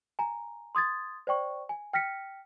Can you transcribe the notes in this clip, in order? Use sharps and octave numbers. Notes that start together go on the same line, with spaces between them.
G#5 A#5
C6 D#6 G#6 A6
C5 D5 G5 C#6
G#5
G5 F6 A#6 B6 C#7